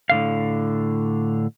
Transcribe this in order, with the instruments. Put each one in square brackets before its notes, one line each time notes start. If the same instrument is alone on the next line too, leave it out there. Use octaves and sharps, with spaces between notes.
[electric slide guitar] A2 D3 F5